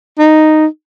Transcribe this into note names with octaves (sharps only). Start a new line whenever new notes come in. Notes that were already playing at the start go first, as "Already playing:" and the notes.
D#4